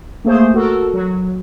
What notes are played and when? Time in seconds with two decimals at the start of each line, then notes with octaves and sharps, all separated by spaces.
0.25 A3 A#3 G#4 C5
0.54 F#4 A4 A#4
0.94 F#3